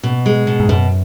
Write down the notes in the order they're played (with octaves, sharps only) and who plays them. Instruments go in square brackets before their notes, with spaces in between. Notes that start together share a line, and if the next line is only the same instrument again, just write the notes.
[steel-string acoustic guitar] B2
G#3
B2
[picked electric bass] G#2
[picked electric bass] F#2 [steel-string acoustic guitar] B2